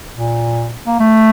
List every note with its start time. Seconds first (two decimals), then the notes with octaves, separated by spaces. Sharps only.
0.16 A#2
0.86 A#3
1.00 A3